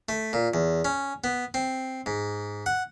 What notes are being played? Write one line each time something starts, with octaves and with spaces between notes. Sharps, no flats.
A3
A#2
E2
C#4
B3
C4
G#2
F#5